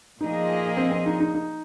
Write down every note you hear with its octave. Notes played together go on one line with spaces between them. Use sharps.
A#2 F3 A#3 D#4 G#4 D#5
C4
C4
D#4
D#4
D#4